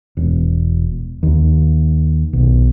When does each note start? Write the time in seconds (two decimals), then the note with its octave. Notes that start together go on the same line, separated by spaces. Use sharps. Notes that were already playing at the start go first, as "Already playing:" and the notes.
0.17 E1
1.23 D#2
2.33 B1